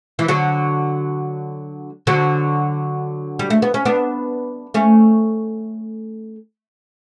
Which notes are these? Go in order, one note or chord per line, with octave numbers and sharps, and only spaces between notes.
E3
D3 F#3
D3 F#3
G3
A3
B3
C#4
B3 D4
A3 C#4